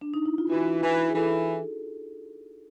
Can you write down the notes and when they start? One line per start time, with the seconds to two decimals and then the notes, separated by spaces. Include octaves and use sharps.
0.01 D4
0.14 D#4
0.26 E4
0.38 F4
0.50 E3 F#4
0.83 E3
1.09 G#4
1.15 E3 A4